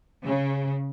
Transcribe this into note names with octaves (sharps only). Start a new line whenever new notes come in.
C#3